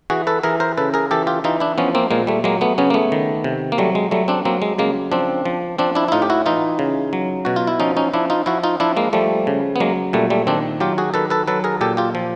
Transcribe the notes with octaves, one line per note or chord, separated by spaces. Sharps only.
E3 F#4 G#4
A4 B4
E3 G#4 A#4
A#4 C5
C#3 A4 B4
G#4 A#4
E3 G4 A4
F4 G4
E3 D#4 F4
D4 E4
F3 B3 C#4
A#3 C4
A#2 G#3 A#3
G3 A3
F#3 G#3 A#3
A3 B3
C#3 B3 C#4
A#3
A3 B3
D#3
C3
A#3
F#3 G3 A3
G#3
F#3 G3 A3
C4 D4
F#3 A#3 C4
G#3
C#3 G#3 A#3
F3 C4 D4
F3
F3 C4 D4
D4 E4
E4
A2 D#4 F4
G4
E4 F#4
E3 D#4 F4
C#3
F#3
B2 F#4
F4
E4
F3 C#4 D#4
C#4 D#4
F3 D4 E4
D#4 F4
F3 E4 F#4
D#4 F4
F3 D4 E4
G#3 A#3
F3 G3 A3
C#3
B3
F#3 G#3 A#3
A#2 G3 A3
G3 A3
D#3 C4 D4
F#3 F4 G4
F#4 G#4
D#3 A4 B4
A4 B4
F#3 A4 B4
G#4 A#4
A#2 G4 A4
F4 G4
F3